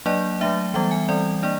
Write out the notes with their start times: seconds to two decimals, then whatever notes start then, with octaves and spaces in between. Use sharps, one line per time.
0.06 F#3 A#3 D4 D5
0.41 F#3 A3 D4 E5
0.74 E3 G3 B3 E5
0.91 G#5
1.08 E3 G3 C4 D5
1.43 A#3 D4 D5